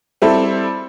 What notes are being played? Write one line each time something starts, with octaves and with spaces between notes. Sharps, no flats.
G3 C4 E4 A4